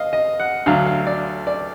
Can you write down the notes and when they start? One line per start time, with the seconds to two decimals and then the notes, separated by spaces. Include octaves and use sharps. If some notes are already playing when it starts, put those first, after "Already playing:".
Already playing: D#5 F5
0.13 D#5
0.40 F#5
0.66 D2 D3 F#3 F5
0.87 F5
1.07 D5
1.47 D5